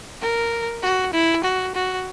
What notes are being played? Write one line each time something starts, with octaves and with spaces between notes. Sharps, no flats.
A#4
F#4
E4
F#4
F#4